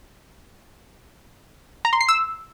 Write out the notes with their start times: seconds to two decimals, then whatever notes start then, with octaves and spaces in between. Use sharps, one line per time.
1.85 A#5
1.93 C6
2.01 C7
2.09 E6